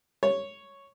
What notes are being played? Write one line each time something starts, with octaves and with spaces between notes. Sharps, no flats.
C#5